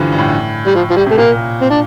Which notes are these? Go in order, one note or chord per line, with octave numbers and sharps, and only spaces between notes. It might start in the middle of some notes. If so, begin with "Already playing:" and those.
Already playing: G2 D3 E3 F3
G2
A2
G3
F3
F3
G3
C3 A3
A#2 A#3
C4
D4